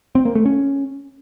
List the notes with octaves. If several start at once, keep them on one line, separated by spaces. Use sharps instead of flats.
C4
A#3
A3
C#4